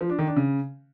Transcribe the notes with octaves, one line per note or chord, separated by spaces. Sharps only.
F3
D4
D#3
D4
C#3